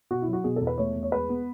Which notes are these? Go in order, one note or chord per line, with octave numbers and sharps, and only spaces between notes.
B2 F#4
E4
F#3
F#4
B2 G#4
E2 A4
B4
A3 C#5
E2
C#5
G#3 B4
B3